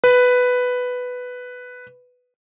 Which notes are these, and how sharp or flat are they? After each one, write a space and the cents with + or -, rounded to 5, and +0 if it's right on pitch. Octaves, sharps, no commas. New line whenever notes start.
B4 +5